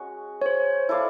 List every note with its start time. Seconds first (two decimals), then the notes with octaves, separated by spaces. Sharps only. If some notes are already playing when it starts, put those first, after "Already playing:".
Already playing: G#3 C#4 F#4
0.42 C#5
0.46 C5
0.89 E4 A4 D5 F5